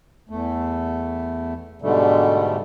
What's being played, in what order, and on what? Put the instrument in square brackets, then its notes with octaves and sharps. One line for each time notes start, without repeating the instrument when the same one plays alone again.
[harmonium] E2 A3
G#2 B2 D3 G3 A3